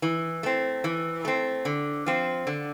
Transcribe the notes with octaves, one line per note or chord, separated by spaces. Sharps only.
E3
A3 C4
E3
A3 C4
D3
F3 C4
D3